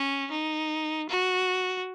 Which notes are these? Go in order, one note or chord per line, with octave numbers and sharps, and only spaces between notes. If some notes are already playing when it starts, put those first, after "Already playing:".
Already playing: C#4
D#4
F#4